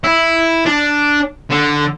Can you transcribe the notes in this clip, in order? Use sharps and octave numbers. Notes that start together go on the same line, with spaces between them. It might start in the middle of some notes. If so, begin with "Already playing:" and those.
E4
D4
D3